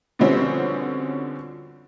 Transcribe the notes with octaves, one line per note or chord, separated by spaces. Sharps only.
B2 D3 F3 G3 C4 C#4